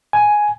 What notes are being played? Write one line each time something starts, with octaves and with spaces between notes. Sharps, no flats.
G#5